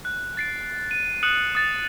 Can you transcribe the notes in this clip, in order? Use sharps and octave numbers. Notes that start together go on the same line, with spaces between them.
F#6
A6 C7 D7
D#7
D#6 F#6 C#7 E7 F#7
D#6 A6